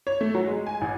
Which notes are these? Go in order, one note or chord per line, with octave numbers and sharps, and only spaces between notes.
C#5
A3
F#3
G#3
G#5
A1